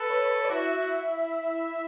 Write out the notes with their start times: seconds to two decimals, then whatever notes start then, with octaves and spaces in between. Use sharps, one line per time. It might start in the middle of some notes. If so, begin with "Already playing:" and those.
Already playing: A4 B4
0.10 C#5
0.45 D5
0.50 E4 F#4 E5